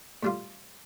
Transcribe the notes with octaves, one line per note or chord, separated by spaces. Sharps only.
A2 G3 D4 F4